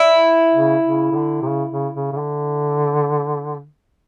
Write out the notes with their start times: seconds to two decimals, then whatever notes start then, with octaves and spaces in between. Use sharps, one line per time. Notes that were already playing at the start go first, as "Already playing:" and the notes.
Already playing: E4
0.54 C#3
0.85 C#3
1.12 C#3
1.16 D3
1.42 C3
1.48 C#3
1.72 C#3
1.95 C#3
2.13 C#3
2.18 D3